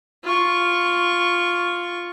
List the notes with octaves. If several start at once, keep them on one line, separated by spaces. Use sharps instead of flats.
F4 C#6